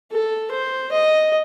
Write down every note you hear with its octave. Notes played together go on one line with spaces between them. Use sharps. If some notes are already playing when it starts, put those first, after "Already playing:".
A4
C5
D#5